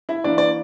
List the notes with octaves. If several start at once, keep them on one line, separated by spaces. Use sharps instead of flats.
E4 E5
E3 A#3 D4 E4 D5
D5